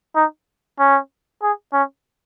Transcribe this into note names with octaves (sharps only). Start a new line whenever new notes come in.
D#4
C#4
G#4
C#4